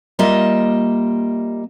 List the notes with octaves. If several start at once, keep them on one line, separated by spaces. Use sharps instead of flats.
G3 A#3 F4 D#5 E5